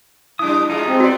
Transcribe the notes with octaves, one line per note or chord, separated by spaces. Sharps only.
G3 D4 E4 D#6
G3 G#3 D#4 F4
G#3 C4
B3 F#4 D5